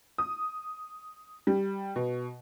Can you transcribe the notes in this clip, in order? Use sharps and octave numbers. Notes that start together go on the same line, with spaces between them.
D#6
G3
B2